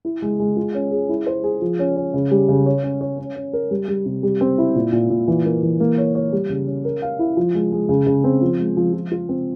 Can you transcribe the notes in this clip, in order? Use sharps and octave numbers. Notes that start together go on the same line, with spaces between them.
E4
G#3
G#3
F4
C#4
G#4
E4
C5
G#4
F3
C#4
C#4
C#3
G3
C#3
C#5
C#4
C#5
C#4
C#4
A#4
G3
G3
C3
G3
C4
E4
A#2
A#2
A#2
E3
A#3
E3
A#3
C#5
C#5
G3
C#3
C#4
A#4
F5
E4
F3
G#3
G#3
C#3
C#3
C4
F3
G#3
F3
F3
F4
C4